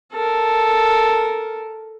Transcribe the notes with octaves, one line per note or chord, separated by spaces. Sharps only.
A4 A#4